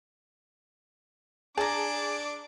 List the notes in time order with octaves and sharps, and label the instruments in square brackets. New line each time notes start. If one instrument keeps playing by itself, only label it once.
[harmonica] D4 [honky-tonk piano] G#4 [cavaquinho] A5 A#5 [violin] D6